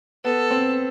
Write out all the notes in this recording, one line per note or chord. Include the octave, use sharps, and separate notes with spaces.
B3 A4
C4